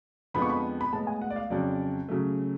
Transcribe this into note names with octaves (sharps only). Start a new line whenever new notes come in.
F2 D3 F3 G#3 B3 B5
C#6
B5
B5
A2 G#3 B3 A5
G#5
F#5
D5
F5
F2 C#3 F#3 D5
C#3 F#3 A3